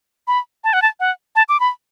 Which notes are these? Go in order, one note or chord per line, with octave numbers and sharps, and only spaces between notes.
B5
A5
F#5
A5
F#5
A5
D6
B5